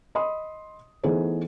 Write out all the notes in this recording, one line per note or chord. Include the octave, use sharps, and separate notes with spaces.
D#5 B5 C6 D#6
E3 A3 B3 D#4 G#4 C5